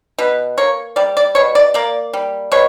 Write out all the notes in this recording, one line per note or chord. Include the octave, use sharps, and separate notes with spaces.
B2 B4
A#3 C#5
G3 D5
D5
B2 C#5
D5
A#3 D5
G3
B2 C#5